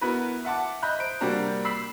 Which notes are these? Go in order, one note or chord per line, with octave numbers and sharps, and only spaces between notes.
B3 E4 F#4 A#4 B4
E5 F#5 A5 D6
D#5 E5 A#5 B5 F#6 G6
C5 D7
C3 G3 A#3 D4 F#4 A#5
B5 E6 B6 C7 F#7